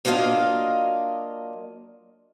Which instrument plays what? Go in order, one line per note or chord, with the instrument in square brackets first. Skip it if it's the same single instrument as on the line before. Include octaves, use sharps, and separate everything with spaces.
[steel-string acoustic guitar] F#3 A#3 D4 F4 D#5 F5